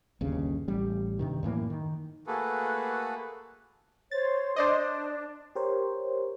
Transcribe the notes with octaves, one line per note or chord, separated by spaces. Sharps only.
G1 D#2 C#3
A1 G3
G2 C3 D#3
F#2 A2 E3 A#3
D#3
A3 A#3 F#4 G#4 A4 B4
C5 C#5 A6
D4 C5 D5 D#5
G4 A#4 C5 C#5